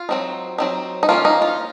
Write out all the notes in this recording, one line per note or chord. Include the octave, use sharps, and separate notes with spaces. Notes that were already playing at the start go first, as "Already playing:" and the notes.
Already playing: F4
F#3 C4 D#4
F#3 C4 D#4
D#4
F3 A#3 C#4 F4
D#4
F4